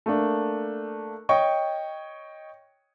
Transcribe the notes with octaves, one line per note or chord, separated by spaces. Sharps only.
A3 A#3 D4
C#5 D#5 G5 C#6